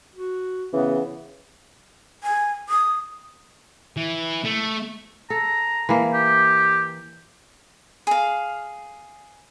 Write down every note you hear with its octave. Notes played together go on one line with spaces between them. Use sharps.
F#4
C#3 E3 B3
G#5
D#6
E3
A3
A4 A#5
E3 A#3
G4
G#4 F5